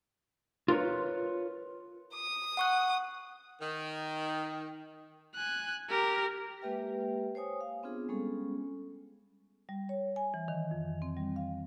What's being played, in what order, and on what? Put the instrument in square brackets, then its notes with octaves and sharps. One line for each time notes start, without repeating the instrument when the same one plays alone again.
[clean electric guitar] F4 A#4 B4 C#5
[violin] D#6
[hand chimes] F#5 C#6 F#6
[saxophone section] D#3
[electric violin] G#5 F#6
G4 A#4
[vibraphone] G#3 A#3 G4 B4 E5 G5
C5 C#5 G#5 D#6
F5
B3 C4 D4 F4 G#4
G3 G#3 B3 C#4 G#4 A4
[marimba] G3
C#5
G#5
E3
D#3
F2
C4
G3
F5